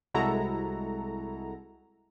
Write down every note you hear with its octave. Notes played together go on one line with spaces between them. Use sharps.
C2 G#3 E4 F#4 A4 A#5